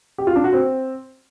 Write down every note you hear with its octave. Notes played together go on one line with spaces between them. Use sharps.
G4
F4
D4
F#4
C4